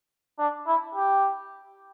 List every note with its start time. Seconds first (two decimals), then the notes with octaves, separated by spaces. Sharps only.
0.39 D4
0.67 E4
0.95 G4